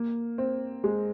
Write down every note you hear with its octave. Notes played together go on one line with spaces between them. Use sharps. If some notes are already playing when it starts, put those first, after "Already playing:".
Already playing: A#3
C4
G#3